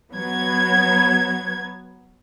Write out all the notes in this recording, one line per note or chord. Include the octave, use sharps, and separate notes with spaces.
F#3 B3 G#6